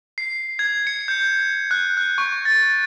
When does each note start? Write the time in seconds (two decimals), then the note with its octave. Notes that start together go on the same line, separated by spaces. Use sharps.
0.18 C7
0.59 G#6
0.87 C#7
1.08 G6
1.71 F#6
1.97 F#6
2.18 C#6
2.45 A6